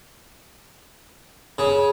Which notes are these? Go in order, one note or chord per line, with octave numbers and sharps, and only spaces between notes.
C#3